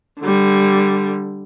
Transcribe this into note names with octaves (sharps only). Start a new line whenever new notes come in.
D3 G3